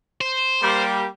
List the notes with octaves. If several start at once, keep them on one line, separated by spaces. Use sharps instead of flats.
C5
G3 A#3 G4